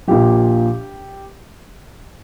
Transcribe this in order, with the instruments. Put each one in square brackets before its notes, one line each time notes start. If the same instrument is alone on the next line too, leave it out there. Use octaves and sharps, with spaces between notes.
[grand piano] A#1 A#2 F3 G4